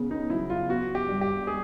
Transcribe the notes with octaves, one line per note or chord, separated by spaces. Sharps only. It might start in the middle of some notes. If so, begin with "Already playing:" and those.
Already playing: C#3 B3
D#4
F#3 E4
F4
B3 F#4
G4
G2
G4
G#3 G#4